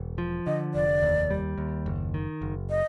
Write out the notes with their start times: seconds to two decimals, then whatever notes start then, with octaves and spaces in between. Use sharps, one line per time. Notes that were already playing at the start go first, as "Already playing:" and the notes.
Already playing: E1
0.18 F3
0.47 D3 D#5
0.74 F1 D5
1.03 D#2
1.30 G3
1.58 D#2
1.86 F#1
2.14 D#3
2.42 F#1
2.70 D#5